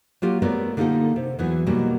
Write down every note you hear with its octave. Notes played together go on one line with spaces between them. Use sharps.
F#3 A#3 F4 G4
G3 A3 B3 A#4 C#5 D5
D3 A#3 D#4 F4 G4 A4
C3
E2 E3 F#3 B3
B2 D#3 F#3 G3 A#3